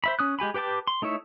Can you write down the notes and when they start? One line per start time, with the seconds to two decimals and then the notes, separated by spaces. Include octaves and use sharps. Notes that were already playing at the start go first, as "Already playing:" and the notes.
0.04 C5 E5 B5
0.19 C#4 D#6 F#6
0.39 G#3 G4 G#5 B5
0.54 G4 B4 G5 A5 D6
0.87 C6
1.02 A3 D#4 E4 C#5 E5